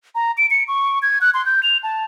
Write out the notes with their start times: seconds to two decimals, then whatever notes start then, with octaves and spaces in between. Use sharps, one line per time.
0.15 A#5
0.38 D7
0.51 C#7
0.68 C#6
1.02 G#6
1.21 F#6
1.34 C6
1.46 G6
1.63 F7
1.83 A5